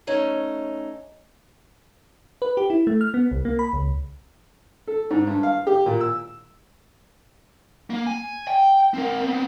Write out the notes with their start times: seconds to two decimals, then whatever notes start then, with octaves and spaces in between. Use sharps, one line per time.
0.07 A3 C#4 D#4
2.42 B4
2.57 G4
2.70 E4
2.87 A3
3.01 F6
3.14 B3
3.32 C2
3.45 A#3
3.59 B5
3.73 C#2
4.87 A4
5.11 G#2
5.27 G2
5.43 F5
5.67 G4
5.86 A#2
6.00 E6
7.90 A#3
8.07 G#5
8.48 G5
8.94 C4 A#4
9.20 B3 C4